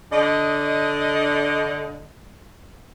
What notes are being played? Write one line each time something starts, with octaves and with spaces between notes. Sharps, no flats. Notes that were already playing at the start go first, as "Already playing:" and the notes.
D3 D4 D#5